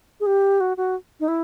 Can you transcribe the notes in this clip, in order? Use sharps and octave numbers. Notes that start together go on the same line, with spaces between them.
G#4
G4
F#4
F#4
D#4
E4